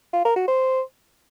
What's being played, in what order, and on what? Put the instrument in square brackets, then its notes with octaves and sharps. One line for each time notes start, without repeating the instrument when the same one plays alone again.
[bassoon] F4
A#4
F#4
C5